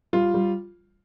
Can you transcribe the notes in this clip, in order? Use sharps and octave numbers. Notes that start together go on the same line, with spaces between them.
G3 F4
G3